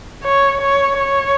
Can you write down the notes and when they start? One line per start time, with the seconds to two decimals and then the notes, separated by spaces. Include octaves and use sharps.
0.24 C#5
0.61 C#5
0.97 C#5